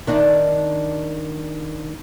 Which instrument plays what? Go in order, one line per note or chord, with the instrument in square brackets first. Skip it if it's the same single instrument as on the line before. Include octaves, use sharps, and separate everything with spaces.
[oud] D#3 D4 D#4